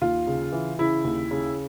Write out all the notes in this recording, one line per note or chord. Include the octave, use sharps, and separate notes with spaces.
D#2 F4
C#3
E3
C#3 E4
D#2
C#3